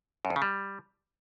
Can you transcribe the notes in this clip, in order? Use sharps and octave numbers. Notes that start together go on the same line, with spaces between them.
F#2
F2
C#3
G3